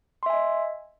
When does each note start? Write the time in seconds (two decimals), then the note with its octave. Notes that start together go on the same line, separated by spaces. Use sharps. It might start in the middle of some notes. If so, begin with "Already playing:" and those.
0.23 C6
0.26 E5
0.30 G#5
0.33 D#5